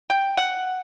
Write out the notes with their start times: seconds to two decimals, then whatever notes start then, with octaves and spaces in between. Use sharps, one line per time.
0.10 G5
0.37 F#5